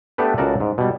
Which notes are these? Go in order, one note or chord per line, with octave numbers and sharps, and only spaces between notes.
A3 B3 D4 G4 A4 B4
C#2 C#3 F#4 A4 A#4 D5
G#2
B2 G3